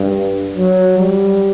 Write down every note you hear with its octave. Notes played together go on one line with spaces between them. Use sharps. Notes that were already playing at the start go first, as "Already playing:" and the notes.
Already playing: G2
F#3
G3